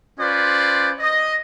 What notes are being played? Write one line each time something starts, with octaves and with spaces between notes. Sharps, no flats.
C#4 F4 B4 C5 D5
D#5